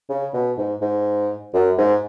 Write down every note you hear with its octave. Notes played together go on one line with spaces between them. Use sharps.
C#3
B2
G#2
G#2
F#2
G#2